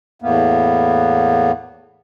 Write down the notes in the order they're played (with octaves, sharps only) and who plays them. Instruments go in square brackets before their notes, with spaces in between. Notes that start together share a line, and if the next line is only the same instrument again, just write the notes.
[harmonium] E2 A2 A#3 B3